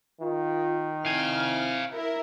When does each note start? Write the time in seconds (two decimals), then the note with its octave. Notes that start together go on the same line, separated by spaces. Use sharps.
0.21 D#3 F4
1.05 C4 E4 F5 G#5 F6
1.92 E4 A#4 E5